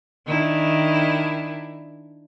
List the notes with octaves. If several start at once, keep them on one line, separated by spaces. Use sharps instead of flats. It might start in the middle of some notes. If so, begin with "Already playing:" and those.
D#3 D4 E4